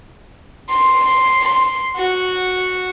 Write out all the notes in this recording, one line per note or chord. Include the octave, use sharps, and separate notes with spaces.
C6
C6
F#4